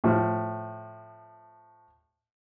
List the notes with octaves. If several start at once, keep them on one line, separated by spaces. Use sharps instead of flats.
A2 F3